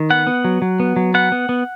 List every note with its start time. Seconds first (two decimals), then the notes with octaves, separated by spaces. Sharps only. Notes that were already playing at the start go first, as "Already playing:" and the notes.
Already playing: D#3
0.10 B3 F#5
0.27 B3
0.45 F#3
0.62 F#3
0.80 B3
0.96 F#3
1.14 B3 F#5
1.32 B3
1.49 B3